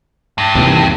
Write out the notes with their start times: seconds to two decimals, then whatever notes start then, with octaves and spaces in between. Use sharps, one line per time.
0.38 G2
0.55 D#2 C3 E3